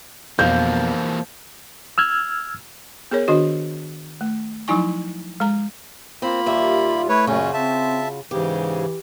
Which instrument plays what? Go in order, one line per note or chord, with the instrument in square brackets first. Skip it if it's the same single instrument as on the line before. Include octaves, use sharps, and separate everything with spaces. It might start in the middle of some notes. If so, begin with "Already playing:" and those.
[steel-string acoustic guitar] F2 B2 D4 [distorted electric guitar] E3 A#3 [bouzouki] F3 [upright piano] G6
[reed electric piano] E6 F6 G#6
[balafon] B3 G#4 A#4 C#5
D#3 D4 F#4 D#5
A3
F3 F#3 D#4 E4 G#5 C#6
G#3 A#5
[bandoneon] A#3 B5 [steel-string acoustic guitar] C4 [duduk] F4
[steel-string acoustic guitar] D#2 G3 E5
[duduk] A3 [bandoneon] E4 B4 C#5
[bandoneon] F#2 A#2 C#4 [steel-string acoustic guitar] C#3 F4 F#4
[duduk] C4 [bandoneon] E5 A5
[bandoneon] G#2 C#3 [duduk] E3 [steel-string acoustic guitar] G4